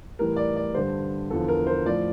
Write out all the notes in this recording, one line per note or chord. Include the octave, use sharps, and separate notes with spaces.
A2 E3 G3 A#4
D5
D5
G2 D3 G3 C5
E2 D3 F3 A4
A#4
C5
A2 F3 D5